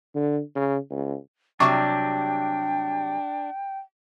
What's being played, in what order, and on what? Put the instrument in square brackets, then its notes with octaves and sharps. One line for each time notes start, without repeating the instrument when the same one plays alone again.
[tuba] D3
C#3
C#2
[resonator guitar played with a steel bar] C3 F#3 G3 [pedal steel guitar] D4 [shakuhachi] G5 [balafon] C#6 D6